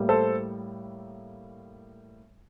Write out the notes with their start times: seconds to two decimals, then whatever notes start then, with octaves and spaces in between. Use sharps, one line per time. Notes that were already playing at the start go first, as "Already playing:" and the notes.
Already playing: A2 G3 A#3
0.09 A4 C5